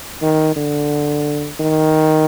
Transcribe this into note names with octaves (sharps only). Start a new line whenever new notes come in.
D#3
D3
D#3